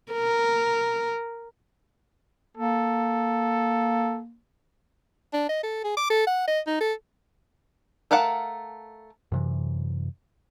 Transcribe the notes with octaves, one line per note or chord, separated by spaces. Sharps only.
A#4
A#3 A4
D4
D#5
A4
G#4
D6
A4
F#5
D#5
D#4
A4
A3 A#4 F5 F#5 A5
F#2 C3 E3